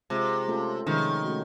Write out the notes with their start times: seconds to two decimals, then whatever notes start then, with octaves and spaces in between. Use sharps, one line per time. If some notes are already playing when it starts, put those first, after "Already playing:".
0.10 C3 G#3 C4 F4 G#4
0.48 A3 C#4 F4 A4
0.87 C3 D#3 F3 G#3 C#4
1.25 A3 C#4 F#4